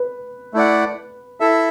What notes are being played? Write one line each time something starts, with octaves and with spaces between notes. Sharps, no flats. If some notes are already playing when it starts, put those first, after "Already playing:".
Already playing: B4
A3 E4 D5 F#5
E4 A4 E5